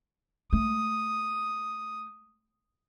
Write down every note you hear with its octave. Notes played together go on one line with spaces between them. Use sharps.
A3 D#6